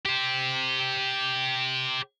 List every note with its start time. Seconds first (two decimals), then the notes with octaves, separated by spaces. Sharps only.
0.05 G4 C5